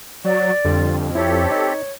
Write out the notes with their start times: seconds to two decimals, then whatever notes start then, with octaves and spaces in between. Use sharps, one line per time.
0.25 F#3 D5
0.65 F2 D3 G3 F4
1.15 C4 E4 G4 A4 C#5
1.51 D#4